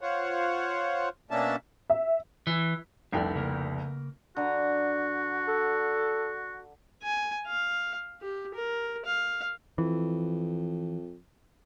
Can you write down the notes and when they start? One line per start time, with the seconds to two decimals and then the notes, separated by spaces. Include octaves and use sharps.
0.01 F4 C5 C#5 F#5
1.31 B2 A#3 C#4 D4 E5 A5
1.90 E5
2.47 E3
3.12 F1 C2 D4 D5 G5
3.35 C#3 A#3 A#4
4.37 D3 F#4 A#5
5.48 A4
7.03 G#5
7.47 F5
8.22 G4
8.54 A#4
9.05 F5
9.78 F2 E3